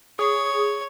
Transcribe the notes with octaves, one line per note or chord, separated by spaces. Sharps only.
G#4 C#5